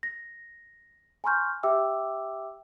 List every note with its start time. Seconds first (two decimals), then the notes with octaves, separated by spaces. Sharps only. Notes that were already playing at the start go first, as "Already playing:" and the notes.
0.03 A#6
1.24 G#5 A#5 C6 C#6 F6 G6
1.63 G4 E5 G5 D6 E6